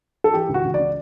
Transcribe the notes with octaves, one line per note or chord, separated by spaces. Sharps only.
A4
E3 G4
C#2
F#4
C#2
D5
C#3